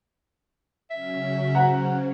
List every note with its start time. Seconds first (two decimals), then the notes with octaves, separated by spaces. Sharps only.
0.90 C#3 F#3 C#4 E5
1.55 C5 F#5 A#5